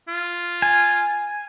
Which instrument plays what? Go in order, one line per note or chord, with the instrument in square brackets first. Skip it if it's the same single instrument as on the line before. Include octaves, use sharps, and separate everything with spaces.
[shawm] F4
[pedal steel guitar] G#5